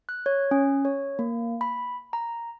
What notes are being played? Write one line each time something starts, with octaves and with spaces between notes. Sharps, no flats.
F#6
C#5
C#4
C#5
A#3
B5
A#5